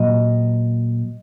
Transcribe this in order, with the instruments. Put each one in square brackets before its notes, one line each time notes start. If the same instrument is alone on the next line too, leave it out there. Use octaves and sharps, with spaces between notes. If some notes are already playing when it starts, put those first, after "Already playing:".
Already playing: [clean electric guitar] A#2 F#3 D#5